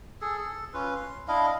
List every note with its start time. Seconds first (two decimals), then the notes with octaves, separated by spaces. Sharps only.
0.21 G#4 A4
0.38 A4
0.74 C#4 F4 B4
0.96 C6
1.28 D4 E4 D#5 F5